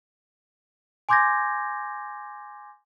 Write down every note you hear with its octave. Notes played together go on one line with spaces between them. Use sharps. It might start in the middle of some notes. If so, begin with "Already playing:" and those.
G#5 C6 D6 G6 G#6 A#6